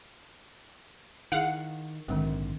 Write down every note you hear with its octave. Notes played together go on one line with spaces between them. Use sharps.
D#3 E4 G#4 F5 F#5
A#1 G#2 D3 D#3 G#3 C4